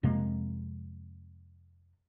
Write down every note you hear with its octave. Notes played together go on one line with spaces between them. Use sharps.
F2 C3 G#3 A#3